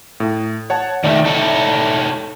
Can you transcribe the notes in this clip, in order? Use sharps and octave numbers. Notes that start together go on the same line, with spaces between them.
A2
C#5 F#5 A5
D#3 A3 D#4 D5 E5
D#4 A4 C#5